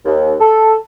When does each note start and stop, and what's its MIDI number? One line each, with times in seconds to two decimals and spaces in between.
0.05 0.33 39
0.40 0.75 69